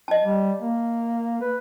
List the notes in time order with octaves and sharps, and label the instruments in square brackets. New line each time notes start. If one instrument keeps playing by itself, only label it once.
[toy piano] D#5 A5
[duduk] G3
A#3
B4